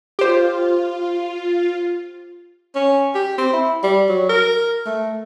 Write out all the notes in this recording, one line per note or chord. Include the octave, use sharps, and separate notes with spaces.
F4 G4 C5
C#4
G4
C4
E4
G3
F#3
A#4
A3